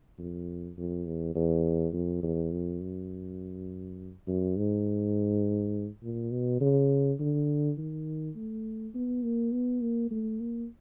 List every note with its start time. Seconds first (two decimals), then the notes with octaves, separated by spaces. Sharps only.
0.18 F2
0.77 F2
1.06 E2
1.35 E2
1.93 F2
2.22 E2
2.52 F2
2.80 F#2
4.27 F#2
4.57 G#2
6.03 A#2
6.31 B2
6.60 C#3
7.19 D3
7.77 D#3
8.35 A3
8.94 B3
9.23 A#3
9.52 B3
9.81 A#3
10.11 A3
10.40 A#3